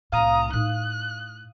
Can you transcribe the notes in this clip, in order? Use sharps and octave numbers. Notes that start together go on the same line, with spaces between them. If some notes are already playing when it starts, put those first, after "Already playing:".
C2 A2 F5 A#5 D#6
A2 D#4 F#6